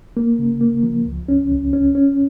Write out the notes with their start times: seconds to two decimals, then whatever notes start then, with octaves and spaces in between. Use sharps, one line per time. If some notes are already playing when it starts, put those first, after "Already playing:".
0.17 A#3
0.39 C#3
0.61 A#3
0.83 F3
1.06 C#2
1.28 C#4
1.51 C#2
1.73 C#4
1.95 C#4